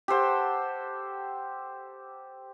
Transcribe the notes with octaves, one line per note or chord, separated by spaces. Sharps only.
G4 A4 C5 F#5